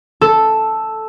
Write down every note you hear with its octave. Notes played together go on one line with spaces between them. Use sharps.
A4